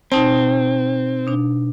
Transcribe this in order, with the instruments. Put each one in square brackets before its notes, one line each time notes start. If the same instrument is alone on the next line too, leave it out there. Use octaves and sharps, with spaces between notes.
[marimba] B2 D#4 A5 [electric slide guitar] C4
[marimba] B2 D4